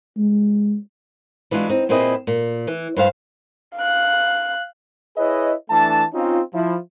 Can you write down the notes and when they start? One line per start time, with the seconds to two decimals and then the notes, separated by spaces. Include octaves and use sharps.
0.18 G#3
1.51 E3 G#3 D4 F4 F#4
1.69 C4 D#4
1.89 A#2 C4 E4 G#4 B4 D#5
2.27 A#2
2.67 E3
2.97 G2 C5 F5
3.77 F5 F#6
5.17 E4 G#4 B4 C#5 D#5
5.70 E3 A3 D4 A5
6.14 C4 C#4 D#4 F4
6.54 F3 E4